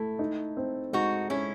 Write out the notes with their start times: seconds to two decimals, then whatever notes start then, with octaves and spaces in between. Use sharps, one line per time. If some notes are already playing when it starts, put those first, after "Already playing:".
Already playing: A3 E4
0.19 D#4
0.57 C4
0.93 G#3 D#4 F#4
1.30 G#3 C#4 E4